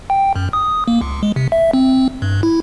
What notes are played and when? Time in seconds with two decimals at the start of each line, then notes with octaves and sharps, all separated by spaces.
0.10 G5
0.36 F#2
0.53 D#6
0.88 A#3
1.01 C#2
1.23 G#3
1.36 C3
1.52 E5
1.73 C4
2.22 G2
2.43 E4